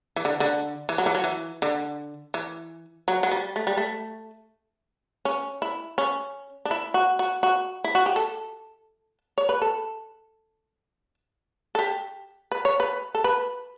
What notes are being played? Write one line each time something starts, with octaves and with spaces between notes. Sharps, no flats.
E3
D3
D3
E3
F#3
E3
F#3
E3
D3
E3
F#3
F#3
G3
A3
G3
A3
C#4
E4
C#4
D4
E4
F#4
F#4
F#4
E4
F#4
G4
A4
C#5
B4
A4
A4
G4
B4
C#5
B4
A4
B4